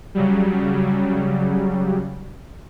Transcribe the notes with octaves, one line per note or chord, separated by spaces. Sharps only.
C#3 F#3 G3